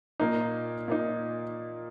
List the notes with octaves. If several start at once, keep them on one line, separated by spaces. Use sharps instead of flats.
A#2 A#3 D#4
A#2 A#3 D#4